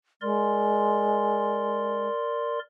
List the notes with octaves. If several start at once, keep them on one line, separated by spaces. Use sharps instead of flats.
G#3 A#4 D5 C6